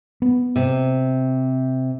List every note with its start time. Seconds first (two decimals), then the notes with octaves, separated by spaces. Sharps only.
0.22 B3
0.56 C3